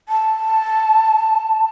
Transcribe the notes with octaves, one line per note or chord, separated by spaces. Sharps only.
A5